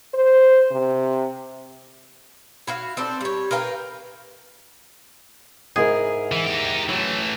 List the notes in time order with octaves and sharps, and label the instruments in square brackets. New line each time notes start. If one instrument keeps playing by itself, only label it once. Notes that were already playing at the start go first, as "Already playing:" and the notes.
[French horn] C5
C3
[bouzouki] E4 F#4 F5
C4 D4 A4
G3 C#5
A#4 B4 F5 G5
[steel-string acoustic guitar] G#2 E4 A#4 [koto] G#4
[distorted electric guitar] E3
D#4 G4
[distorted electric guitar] E3 A3 [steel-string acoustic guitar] F#3